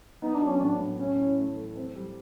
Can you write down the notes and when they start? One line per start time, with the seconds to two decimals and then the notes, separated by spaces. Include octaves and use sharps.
0.22 B3 D#4
0.35 D4
0.41 F#3
0.47 C#4
0.60 A2 D4
0.80 A2
0.99 A3 C#4
1.18 E4
1.37 A3
1.57 A4
1.76 C4
1.95 G3